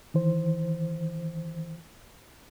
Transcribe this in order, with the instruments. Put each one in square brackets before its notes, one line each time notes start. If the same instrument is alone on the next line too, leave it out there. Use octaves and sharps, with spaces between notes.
[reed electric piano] D#3 E3 C5